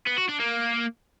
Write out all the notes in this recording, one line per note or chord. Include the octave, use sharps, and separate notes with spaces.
B3
F#4
D4
A#3